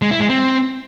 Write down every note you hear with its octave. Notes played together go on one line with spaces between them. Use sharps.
G#3
E4
G#3
C4